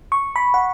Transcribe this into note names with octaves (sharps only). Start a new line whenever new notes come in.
C#6
B5
F#5